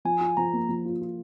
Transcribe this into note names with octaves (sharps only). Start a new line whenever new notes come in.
F3 G#5
F4
F3 A#5
A#3
F3
F4
F4